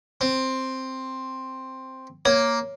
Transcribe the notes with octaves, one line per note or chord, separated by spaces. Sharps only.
C4
A#3 C#5